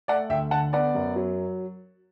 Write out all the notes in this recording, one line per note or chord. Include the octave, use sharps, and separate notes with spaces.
A3 D5 F#5
D2 E5 G5
D3 F#5 A5
B3 D5 F#5
F#2
F#3